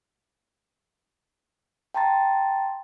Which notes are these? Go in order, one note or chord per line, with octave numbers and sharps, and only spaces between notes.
G5 A5 A#5 C6 A6